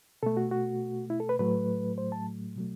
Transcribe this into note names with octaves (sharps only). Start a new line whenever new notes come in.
B2 A3 A4
F#4
F#4
E4
A4
B4
A2 F#3 A3 B4
C5
A5
B2 F#3 A3